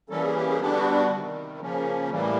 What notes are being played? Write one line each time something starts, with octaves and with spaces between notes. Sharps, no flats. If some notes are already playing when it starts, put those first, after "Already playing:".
E3 G3 A#3 C#4 A4
G#4
G4
G#4
D3 G3 B3 D4 G4
F#4
F#4
C3 D#3 G3
C#3 F3 A#3 C#4
A2 E3 G3 A#3